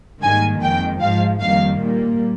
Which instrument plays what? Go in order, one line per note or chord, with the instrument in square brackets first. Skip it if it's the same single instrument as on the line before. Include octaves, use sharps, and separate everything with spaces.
[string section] G#2 D#3 G3 A#3 G#5
F2 D#3 G#3 G5
G#2 F3 G#3 F5
F2 D#3 G3 A#3 F5
A#2 G3 A#3